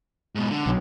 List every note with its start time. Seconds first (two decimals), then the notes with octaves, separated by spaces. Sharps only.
0.35 G#2 B2
0.51 D3
0.66 B1